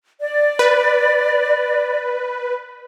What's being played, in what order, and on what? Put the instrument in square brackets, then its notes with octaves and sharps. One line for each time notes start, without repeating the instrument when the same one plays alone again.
[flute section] D5
[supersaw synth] B4